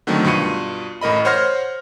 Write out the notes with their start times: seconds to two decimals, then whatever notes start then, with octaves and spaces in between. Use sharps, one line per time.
0.07 D3 D#3 F#3 A3 C4
0.24 G2 B2 F4 C#7 D#7
1.01 A1 A2 A#4 D#5 B5
1.25 C5 C#5 F#5 C6 F6 A#6